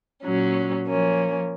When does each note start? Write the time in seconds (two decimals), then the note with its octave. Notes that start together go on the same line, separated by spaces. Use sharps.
0.23 A#2 F#3 C#4
0.86 F3 A#3 C#4